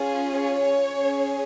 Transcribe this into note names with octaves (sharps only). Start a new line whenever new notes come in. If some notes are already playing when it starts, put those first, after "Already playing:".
Already playing: C#4 F4 G#4
C#5
C#4 G#4